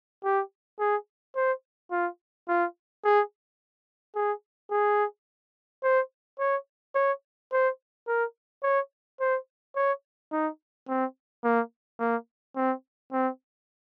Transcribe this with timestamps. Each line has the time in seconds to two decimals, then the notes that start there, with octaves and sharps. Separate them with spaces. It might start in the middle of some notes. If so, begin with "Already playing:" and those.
0.24 G4
0.79 G#4
1.35 C5
1.91 F4
2.48 F4
3.04 G#4
4.15 G#4
4.71 G#4
5.83 C5
6.39 C#5
6.95 C#5
7.52 C5
8.07 A#4
8.63 C#5
9.20 C5
9.76 C#5
10.32 D#4
10.88 C4
11.44 A#3
11.99 A#3
12.56 C4
13.12 C4